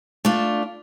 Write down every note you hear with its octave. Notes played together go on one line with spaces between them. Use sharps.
A3 D4 F4